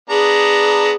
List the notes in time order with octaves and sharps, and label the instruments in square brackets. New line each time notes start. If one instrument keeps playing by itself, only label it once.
[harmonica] B3 D4 A#5 [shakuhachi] G#4